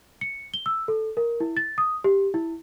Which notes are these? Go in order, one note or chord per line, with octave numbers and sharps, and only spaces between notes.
C#7
G7
E6
A4
A#4
E4
A6
D#6
G4
E4